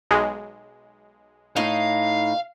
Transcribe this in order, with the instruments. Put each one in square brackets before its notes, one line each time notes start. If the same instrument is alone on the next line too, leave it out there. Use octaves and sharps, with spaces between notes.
[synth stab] B1 G#3
[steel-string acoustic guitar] A2 D#4 D#5 [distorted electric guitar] F5